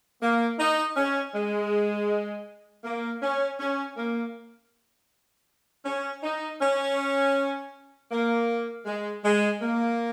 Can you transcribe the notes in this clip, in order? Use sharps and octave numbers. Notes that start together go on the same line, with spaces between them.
A#3
D#4
C#4
G#3
A#3
C#4
C#4
A#3
C#4
D#4
C#4
A#3
G#3
G#3
A#3